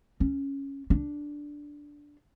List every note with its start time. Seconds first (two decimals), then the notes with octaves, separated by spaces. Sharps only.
0.20 C#4
0.90 D4